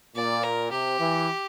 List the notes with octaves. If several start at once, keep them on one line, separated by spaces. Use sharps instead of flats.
A#2 D5
A#4
C3 G4
E3